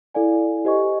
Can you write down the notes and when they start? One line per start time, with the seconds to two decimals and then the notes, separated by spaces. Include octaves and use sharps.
0.15 E4 A4 D5 F5 G#5
0.65 G4 C5 D#5 G#5 C#6